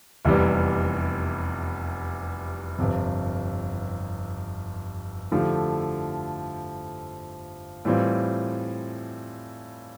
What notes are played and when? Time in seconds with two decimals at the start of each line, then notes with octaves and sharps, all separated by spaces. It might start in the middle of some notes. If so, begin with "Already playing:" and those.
0.25 F1 E2 C3 E3 G3
2.78 G1 F2 C3
5.32 D3 F3 A3 E4 G4
7.85 A2 E3 G3 C4 F4